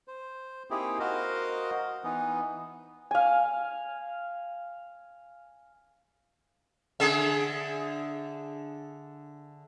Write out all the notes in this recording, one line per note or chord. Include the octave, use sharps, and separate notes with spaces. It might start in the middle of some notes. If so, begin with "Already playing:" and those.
C5
A#3 C4 D#4 E4 G4 G#4
F#4 A#4 C5 D#5 F5
E3 B3 D#4
F5 G#5
D3 G#4 E5